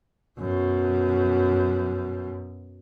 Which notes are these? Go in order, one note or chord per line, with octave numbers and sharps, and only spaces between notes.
F#2 B2